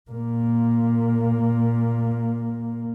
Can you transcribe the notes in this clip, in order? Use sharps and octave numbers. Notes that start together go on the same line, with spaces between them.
A#2 A#3